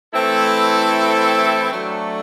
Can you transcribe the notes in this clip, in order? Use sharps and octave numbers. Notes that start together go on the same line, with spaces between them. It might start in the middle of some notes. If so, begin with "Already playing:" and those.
E3 A3 C4 E4 A4
F#3 A3 D4